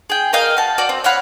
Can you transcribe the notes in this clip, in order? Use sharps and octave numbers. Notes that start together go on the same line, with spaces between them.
G#4 G5
A#4 D#5 F5 G5
F#4 A5
F#4 D5
C4
C#5 F5 F#5 B5